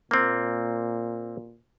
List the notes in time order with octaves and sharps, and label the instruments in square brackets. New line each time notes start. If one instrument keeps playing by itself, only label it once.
[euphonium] A#2 [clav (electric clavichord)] A#3 C4